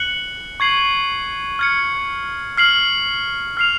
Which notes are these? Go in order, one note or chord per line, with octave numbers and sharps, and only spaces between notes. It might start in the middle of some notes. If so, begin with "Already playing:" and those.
Already playing: F#6 C#7 F#7
C#6 G#6 C7 F#7
F6 G#6 C#7
F6 C7 F#7
F6 C7 F7